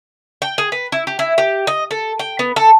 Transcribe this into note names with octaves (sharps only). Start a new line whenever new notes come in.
G5
G#4
B4
E4
G4
E4
G4
D#5
A4
G5
B3
A4